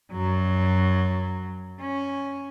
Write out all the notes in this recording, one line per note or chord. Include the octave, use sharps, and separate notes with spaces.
F#2 F#3
C#4